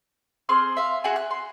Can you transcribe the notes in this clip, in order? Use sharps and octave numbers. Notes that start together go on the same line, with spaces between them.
C4 G#4 C6 F6
E5 F5
F#4 G#4 F#5 G#5
F#6
C6